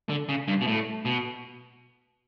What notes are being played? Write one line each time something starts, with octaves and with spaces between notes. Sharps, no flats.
D3
C#3
G2
B2
A2
B2